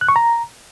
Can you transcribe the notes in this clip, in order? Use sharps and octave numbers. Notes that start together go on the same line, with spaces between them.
F#6
C#6
A#5